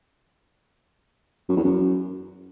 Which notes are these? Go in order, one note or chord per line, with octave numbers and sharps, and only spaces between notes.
F#2
E2
F#2